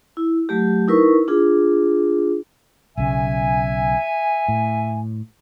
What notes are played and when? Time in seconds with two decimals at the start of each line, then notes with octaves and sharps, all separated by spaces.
0.17 E4
0.49 F#3 A3 G4
0.88 D#4 E4 A#4 B4 C#6
1.28 D4 F4 G#4
2.98 B1 C#3 E5 G#5
4.48 A2